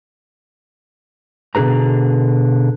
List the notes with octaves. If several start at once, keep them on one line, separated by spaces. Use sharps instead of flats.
B2 D3 G#4 B4 A#5